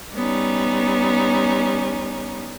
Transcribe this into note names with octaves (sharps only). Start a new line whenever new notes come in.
G3 B3 C#4 D#4